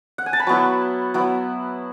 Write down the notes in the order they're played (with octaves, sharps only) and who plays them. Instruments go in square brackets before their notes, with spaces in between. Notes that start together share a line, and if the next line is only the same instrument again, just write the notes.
[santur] F#5
G#5
A5
B5
F#3 B3 E4 C#6
F#3 B3 E4